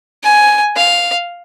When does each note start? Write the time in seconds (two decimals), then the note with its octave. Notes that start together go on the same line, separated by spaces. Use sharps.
0.23 G#5
0.76 F5